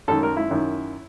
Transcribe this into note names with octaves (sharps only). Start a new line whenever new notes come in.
F#2 D#3 A4
A#4
E4
F#2 D#3